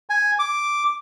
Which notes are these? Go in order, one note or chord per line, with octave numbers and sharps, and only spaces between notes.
G#5
D6